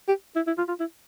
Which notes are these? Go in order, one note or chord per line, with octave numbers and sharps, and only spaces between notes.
G4
E4
E4
F4
F4
E4